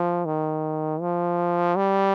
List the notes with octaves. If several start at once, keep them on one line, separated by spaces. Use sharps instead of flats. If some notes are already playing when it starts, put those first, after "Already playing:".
Already playing: F3
D#3
F3
G3